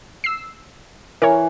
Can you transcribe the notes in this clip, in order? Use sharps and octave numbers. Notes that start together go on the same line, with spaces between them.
E6 C7
E3 A#4 C#5